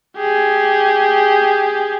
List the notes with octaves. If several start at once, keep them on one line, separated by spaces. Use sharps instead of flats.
G4 G#4